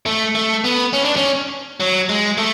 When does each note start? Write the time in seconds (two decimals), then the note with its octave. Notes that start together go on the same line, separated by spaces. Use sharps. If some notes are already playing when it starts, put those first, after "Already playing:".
0.06 A3
0.35 A3
0.64 B3
0.93 C#4
1.05 D4
1.16 C#4
1.80 F#3
2.09 G#3
2.38 A3